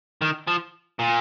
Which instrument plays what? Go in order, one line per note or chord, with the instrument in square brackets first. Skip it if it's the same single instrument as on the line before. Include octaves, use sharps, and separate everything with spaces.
[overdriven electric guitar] D#3
F3
A#2